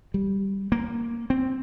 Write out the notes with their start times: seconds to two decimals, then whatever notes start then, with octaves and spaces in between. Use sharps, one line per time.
0.14 G3
0.72 A#3
1.30 C4